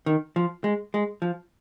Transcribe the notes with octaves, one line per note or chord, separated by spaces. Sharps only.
D#3
F3
G#3
G#3
F3